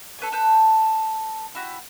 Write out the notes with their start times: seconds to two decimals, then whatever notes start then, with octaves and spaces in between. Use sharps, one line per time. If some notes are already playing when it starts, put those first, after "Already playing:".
0.19 A4 B4 C#5 G#5
0.32 A4 B4 G6
1.55 E4 F#4 G4